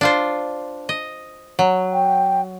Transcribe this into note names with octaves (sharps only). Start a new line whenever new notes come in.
D4 F4 C5
D#5
F#3
G5